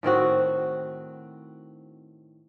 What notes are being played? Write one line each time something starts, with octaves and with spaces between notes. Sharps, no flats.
A2 D#3 C4 F#4